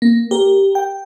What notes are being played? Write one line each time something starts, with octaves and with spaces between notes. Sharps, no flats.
A#3
G4 A#4
G5